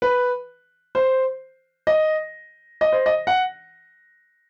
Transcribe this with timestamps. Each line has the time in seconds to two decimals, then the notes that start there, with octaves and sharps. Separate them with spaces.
0.02 B4
0.95 C5
1.87 D#5
2.81 D#5
2.92 C5
3.06 D#5
3.27 F#5